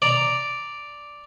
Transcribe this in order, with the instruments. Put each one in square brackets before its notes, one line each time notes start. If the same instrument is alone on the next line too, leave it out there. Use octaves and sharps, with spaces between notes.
[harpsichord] D5 A#5